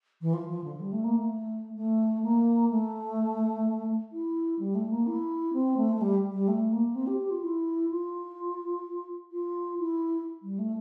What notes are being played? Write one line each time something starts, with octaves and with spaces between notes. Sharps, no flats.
E3
F3
F3
D3
G3
A3
A#3
A3
A3
A#3
A3
E4
G3
A3
A#3
E4
C4
A3
A3
G3
G3
A3
A#3
C4
G4
G4
F4
E4
F4
F4
E4
G3
A3